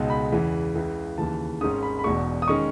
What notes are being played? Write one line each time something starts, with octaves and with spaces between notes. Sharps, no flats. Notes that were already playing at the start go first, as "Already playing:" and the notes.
Already playing: C#2 B2 G#3 D#4
B5
E2 C#3 E3
C#2 C#3 E3
D#2 C#3 E3 A5
G#1 G#2 D#3 G#3 C#4 D#6
B5
B5
E1 E2 B2 G#3 C#6
D#6
D#3 G#3 C#4 C#6